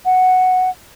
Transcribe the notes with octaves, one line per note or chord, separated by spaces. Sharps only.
F#5